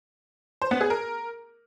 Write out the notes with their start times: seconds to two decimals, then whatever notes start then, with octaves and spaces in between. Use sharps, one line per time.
0.62 C5
0.71 B3
0.81 G#4
0.90 A#4